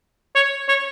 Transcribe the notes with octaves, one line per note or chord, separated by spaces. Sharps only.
C#5
C#5